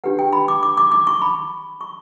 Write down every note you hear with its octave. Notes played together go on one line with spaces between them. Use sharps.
D4 G4 B4 F#5
G5
B5
D6
D6
D6
D6
C#6
B5
C#6